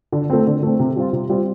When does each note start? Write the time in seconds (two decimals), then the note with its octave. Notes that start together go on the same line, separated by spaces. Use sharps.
0.12 D3
0.30 A3 C4
0.47 D3
0.63 A3 C4
0.79 C3
0.96 G3 C4 F4
1.13 C3
1.29 G3 C4 F4